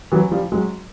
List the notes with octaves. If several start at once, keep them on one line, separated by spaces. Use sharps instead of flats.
E3 F#3
F3 G3
F#3 G#3